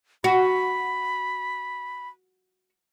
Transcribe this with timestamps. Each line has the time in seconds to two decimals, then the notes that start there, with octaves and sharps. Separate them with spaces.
0.24 F#4 B5